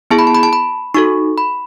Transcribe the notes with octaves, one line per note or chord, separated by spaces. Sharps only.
B3 E4 G#4 A5
B5
A5
B5
A5
B5
D#4 F#4 A4 C#6
B5